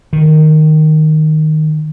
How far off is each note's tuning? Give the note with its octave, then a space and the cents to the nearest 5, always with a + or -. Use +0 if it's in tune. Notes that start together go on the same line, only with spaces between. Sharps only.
D#3 -5